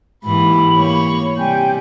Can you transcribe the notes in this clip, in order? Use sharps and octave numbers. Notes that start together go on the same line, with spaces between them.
G#2 E3 A#3 G4 B5
A#3 C#5
C3 G3 G5 G#5 G6